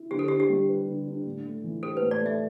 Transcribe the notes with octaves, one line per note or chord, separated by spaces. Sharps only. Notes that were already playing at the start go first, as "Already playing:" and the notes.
Already playing: E4
D3 G4
A4
D4 G4
G4
G3
B4
D3
D4
A2
A3
E3
G4 A4
B4
A2
D5
A3 E5